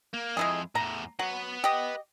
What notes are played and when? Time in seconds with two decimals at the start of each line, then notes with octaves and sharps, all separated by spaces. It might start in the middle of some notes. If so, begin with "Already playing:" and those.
0.14 A#3
0.37 F2 G#3 E4 G#4
0.75 E2 A2 A#5
1.19 F#3 B4 F#5
1.64 G4 D#5